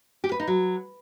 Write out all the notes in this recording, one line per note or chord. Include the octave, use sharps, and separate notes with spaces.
G4
B4
D#4
F#3